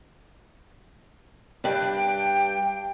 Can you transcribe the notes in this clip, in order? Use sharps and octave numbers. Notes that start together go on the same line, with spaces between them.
G2 D4 G5